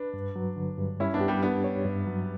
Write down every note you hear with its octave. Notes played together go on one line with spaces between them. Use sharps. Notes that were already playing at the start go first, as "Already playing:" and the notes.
Already playing: D4 B4
G2
F#3
D3
G2
G3 C#4 E4
B3 D4
G4
G3 B3
G3 B3 D4
C#5
G2
F#3